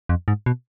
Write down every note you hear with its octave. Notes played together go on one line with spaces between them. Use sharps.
F2
G#2
B2